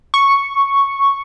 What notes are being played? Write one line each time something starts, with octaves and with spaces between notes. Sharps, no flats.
C#6